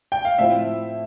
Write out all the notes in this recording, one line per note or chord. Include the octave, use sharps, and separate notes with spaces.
G5
F5
A2 F3 C4 E4 E5